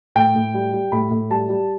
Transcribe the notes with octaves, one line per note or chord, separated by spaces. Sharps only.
A2 G5
A2
G3
G3
A2 B5
A2
G3 A5
G3